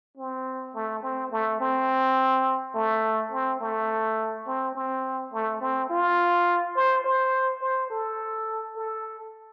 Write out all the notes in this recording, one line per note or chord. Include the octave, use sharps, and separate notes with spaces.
C4
A3
C4
A3
C4
A3
C4
A3
C4
C4
A3
C4
F4
C5
C5
C5
A4
A4